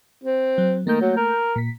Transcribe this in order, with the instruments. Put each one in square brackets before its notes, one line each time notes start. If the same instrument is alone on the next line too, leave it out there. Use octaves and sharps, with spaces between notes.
[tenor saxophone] C4
[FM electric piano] F#3
[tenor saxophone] D#3 [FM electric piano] A3 A#3 G6
[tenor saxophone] F#3
A#4
[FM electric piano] A#2 B6